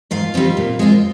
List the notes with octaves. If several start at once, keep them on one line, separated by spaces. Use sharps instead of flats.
G#2 F4 F5
G3 C4 D#4
A#2
G#3 C4 F4